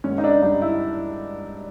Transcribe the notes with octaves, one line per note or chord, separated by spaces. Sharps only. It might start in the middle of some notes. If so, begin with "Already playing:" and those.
G#1 C#4
D#4
D4
G2 D#4
E4